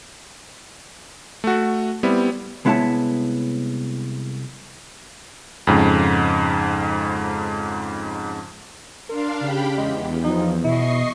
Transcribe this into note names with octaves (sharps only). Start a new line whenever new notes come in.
A3 F#4
G3 B3 C4 E4
C2 G#3 B3 E4 C#5 A5
F2 G#2 C#3
D4 A#4 F5 C6
C#3 G4 G5 B5
E2 G#3
F3 D#4
B2 E4 D#5 C#6 C7